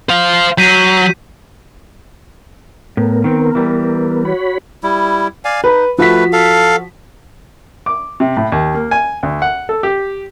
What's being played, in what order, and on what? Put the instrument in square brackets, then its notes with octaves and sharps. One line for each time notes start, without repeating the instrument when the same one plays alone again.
[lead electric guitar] C5 F5
[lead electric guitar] F#3 [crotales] G6 B6 D#7
[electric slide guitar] A2 [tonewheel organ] B3 A#4
[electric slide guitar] D#3 C4
E3 G3
[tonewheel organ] F#4 C#5 B5
[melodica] G3 E4
D5 F5 G#5
[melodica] D#4 [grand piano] B4 B5
[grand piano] F3 F#4 B6 [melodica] A3 B4
[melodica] A4 F5
[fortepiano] D6
C3
A2
D#2
A#3
G#5
D2
F#5
A4
G4